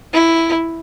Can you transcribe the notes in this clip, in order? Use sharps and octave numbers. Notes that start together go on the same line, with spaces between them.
E4